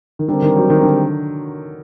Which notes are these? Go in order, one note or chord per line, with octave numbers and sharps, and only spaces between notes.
D#3
D3 G3 C4 G4 A#4
D#3
F#3
D#3
D3